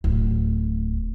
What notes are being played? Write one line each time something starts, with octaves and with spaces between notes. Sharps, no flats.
D1